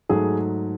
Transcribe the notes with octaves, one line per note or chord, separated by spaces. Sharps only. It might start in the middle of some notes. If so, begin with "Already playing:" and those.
G#2 F#3 A3 G#4